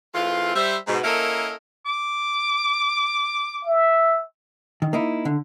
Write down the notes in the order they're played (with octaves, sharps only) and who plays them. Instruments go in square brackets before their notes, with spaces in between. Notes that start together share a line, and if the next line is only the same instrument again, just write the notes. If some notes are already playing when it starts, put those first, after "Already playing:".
[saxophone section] E3 G#3 A3 C4 F4
G3 C5 E5
G#2 B2
A#3 C#4 E4 A4 A#4 D#5
[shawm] D6
[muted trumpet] E5
[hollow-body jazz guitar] D#3
A#3 D#4 E4
D3